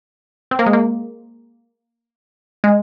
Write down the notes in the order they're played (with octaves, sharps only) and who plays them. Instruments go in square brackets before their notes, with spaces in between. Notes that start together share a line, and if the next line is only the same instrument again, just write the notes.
[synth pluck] C4
A#3
G#3
A#3
G#3